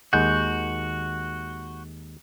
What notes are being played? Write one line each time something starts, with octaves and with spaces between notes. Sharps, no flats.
D#2 G#3 F#4 F#5 G6